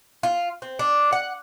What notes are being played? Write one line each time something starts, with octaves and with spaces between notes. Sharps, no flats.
F4
C4
D4
F#5